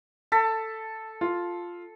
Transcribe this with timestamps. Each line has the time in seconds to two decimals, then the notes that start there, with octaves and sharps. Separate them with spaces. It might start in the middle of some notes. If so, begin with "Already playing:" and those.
0.32 A4 A5 A6 B6
1.21 F4